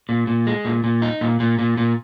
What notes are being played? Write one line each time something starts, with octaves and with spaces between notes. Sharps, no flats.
A#2
A#2
G#3
A#2
A#2
D#4
A#2
A#2
A#2
A#2